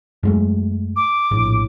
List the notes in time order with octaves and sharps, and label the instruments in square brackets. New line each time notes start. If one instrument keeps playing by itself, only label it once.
[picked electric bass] F#2 G#3 A3
[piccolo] D6
[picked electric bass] A#1 [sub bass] A2